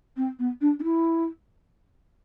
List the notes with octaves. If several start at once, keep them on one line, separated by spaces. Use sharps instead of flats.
C4
B3
D4
D4
E4